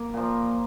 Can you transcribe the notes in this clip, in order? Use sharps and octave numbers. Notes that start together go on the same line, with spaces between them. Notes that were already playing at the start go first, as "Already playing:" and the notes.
Already playing: A#3
A#2 F3